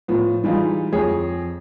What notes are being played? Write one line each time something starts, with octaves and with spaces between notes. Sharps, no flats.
A2 F3 B3
E3 G3 G#3 D#4 F4
F2 G#4 C#5